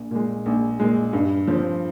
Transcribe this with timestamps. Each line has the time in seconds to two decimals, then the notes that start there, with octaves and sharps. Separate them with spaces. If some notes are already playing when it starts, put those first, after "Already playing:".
Already playing: A#1
0.11 A#2 G#3
0.46 A#1
0.80 A#2 G#3
1.13 G2
1.48 F3 C4